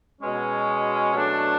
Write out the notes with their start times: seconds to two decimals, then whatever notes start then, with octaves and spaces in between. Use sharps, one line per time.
0.21 B2 G#3 C#4
1.14 B2 F#3 A3 D4